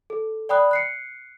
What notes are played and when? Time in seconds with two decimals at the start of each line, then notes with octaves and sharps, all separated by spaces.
0.10 A4
0.49 D5 G5 B5 D#6 F#6
0.71 F#6 C7 C#7